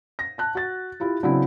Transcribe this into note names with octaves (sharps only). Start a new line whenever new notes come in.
A#6
A5 F#6
F#4 A6
E4 F4 G4
C#3 F#3 C4 D4 E4